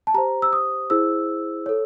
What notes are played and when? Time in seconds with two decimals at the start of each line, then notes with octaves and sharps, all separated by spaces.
0.07 A5
0.14 G4 C5 A#5
0.42 E6
0.53 D#6
0.90 E4 G#4 C5 E6
1.66 A4 C#5